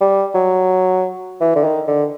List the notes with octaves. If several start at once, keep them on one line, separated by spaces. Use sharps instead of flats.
G3
F#3
E3
D3
D#3
D3